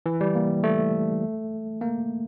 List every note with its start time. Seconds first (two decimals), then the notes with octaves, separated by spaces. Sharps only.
0.06 E3
0.21 G3
0.35 A#3
0.64 A3
1.81 A#3